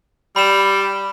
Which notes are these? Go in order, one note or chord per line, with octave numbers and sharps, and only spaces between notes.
G3 B5 E7